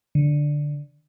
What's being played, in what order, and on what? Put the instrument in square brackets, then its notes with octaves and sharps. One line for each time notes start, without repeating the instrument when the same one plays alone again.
[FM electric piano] D3